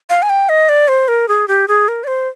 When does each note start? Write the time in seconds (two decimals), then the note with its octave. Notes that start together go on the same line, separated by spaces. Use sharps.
0.10 F5
0.22 G#5
0.30 G5
0.49 D#5
0.69 D5
0.88 C5
1.08 A#4
1.28 G#4
1.48 G4
1.68 G#4
1.88 A#4
2.04 D5
2.07 C5